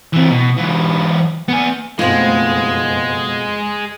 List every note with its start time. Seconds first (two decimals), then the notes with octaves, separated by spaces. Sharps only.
0.13 E3 C4
0.31 B2
0.58 E3 F#3
1.48 B3 G#5
1.99 F#1 F2 B2 G#3 A3 C4 F4